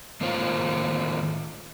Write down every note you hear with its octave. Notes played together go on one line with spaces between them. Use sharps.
A2 D#3 A#3 F4 C5 C#5